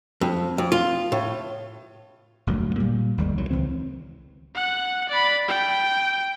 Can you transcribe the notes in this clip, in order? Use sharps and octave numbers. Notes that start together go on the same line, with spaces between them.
F2
F2
F4
A2
G1 D2 A#2 F#3
A#2 G3 A#3
G#1 D#2 G3 G#3
C2 D#3 F#3
C#2 E3 C4
F#5 F#6
D5 B5
G5